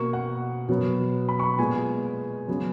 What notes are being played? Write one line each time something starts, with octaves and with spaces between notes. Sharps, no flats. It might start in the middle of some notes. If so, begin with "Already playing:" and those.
Already playing: B2 A#3 C#6
F#5
B2 F#3 B3
B5
C#6
B5
A#2 G#3 B3 G#5
C#3 F#3 B3